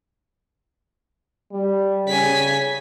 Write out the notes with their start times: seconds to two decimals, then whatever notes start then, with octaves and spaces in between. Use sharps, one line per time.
1.52 G3
2.08 C#3 G#5 B6